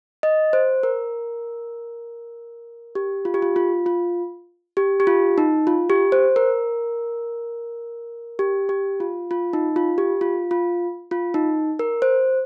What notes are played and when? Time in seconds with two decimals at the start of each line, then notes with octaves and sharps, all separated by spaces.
0.23 D#5
0.53 C5
0.83 A#4
2.95 G4
3.25 F4
3.34 G4
3.42 F4
3.56 F4
3.86 F4
4.77 G4
5.00 G4
5.07 F4
5.38 D#4
5.67 F4
5.90 G4
6.12 C5
6.36 A#4
8.39 G4
8.69 G4
9.00 F4
9.31 F4
9.53 D#4
9.76 F4
9.98 G4
10.21 F4
10.51 F4
11.11 F4
11.34 D#4
11.79 A#4
12.02 C5